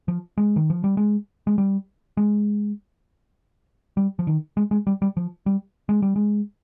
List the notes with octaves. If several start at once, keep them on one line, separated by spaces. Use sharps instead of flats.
F3
G#3
D#3
F3
G3
G#3
G#3
G3
G#3
G3
F3
D#3
G#3
G#3
G3
G3
F3
G3
G#3
G3
G#3